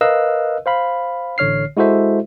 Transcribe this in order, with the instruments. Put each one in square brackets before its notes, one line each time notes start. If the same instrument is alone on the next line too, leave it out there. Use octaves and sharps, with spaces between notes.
[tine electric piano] A#4 B4 D#5 F5 E6 F#6
C5 F5 B5
A1 D3 C#5 F6 C7
G#3 E4 F#4 A4 C5 E5